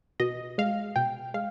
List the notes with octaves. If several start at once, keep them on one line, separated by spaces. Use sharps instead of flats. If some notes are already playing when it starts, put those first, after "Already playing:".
B2 D#5
G#3 F5
B2 G5
G#3 F5